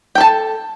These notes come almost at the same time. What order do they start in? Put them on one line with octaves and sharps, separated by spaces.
G5 A4 A5